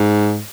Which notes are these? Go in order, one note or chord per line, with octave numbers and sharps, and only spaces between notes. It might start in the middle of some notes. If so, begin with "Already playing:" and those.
Already playing: G#2